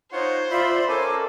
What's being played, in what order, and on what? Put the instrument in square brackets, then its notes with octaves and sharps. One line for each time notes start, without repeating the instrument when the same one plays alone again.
[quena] D#4 [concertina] F4 C#5 F#5 [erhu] C5
[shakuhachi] F4 [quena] D5 [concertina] E5 B5
[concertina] C#4 A4 G#5 [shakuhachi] A#4 [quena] D6